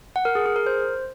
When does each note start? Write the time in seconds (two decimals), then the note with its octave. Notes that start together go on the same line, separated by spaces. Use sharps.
0.16 F#5
0.25 A#4
0.35 G#4
0.46 G#4
0.56 A#4
0.66 C5